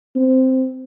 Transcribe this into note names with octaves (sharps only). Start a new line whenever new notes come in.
C4